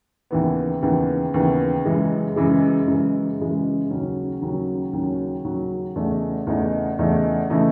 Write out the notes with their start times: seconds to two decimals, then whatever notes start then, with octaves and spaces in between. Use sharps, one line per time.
0.31 D#2 C#3 E3 B3
0.82 D#2 C#3 E3 B3
1.34 D#2 C#3 E3 B3
1.85 F#2 C#3 E3 G#3
2.36 F#2 C#3 E3 G#3
2.87 F#2 C#3 E3 G#3
3.39 F#2 C#3 E3 G#3
3.90 D#2 C#3 F#3 C#4
4.41 D#2 C#3 F#3 C#4
4.93 D#2 C#3 F#3 C#4
5.44 D#2 C#3 F#3 C#4
5.96 E2 C#3 E3 A3 D#4
6.47 E2 C#3 E3 A3 D#4
6.99 E2 C#3 E3 A3 D#4
7.50 C#3 E3 A3 D#4